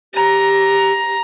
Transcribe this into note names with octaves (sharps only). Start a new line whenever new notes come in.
G4 A#5